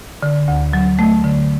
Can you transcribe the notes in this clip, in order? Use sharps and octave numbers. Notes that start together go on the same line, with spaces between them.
D3
D2
F#3
A3
D3